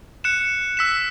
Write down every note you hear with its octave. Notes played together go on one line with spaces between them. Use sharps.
F#6 C#7 E7
E6 B6 E7